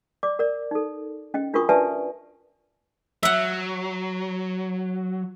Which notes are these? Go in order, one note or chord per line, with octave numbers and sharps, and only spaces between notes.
D5 D6
A#4 D5
D#4 A4
C#4 D#5 G5
D4 F4 F#4 A#4 C#6 D#6
G4 B4 D5 E5 G#5 A5
F#3 E5 F#5